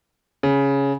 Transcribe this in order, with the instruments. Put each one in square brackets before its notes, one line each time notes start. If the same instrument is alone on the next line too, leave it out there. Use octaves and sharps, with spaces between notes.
[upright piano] C#3